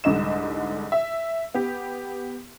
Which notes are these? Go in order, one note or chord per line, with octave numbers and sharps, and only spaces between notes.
C2 G#2 D3 D#5 E7
E5
B3 G4